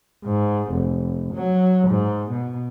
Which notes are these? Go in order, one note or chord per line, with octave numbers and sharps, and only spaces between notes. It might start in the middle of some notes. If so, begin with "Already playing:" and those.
G#2
F1
F#3
G#2
B2